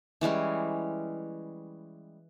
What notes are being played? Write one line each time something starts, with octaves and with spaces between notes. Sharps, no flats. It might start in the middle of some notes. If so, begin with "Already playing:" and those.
E3 G3 G#3 C#4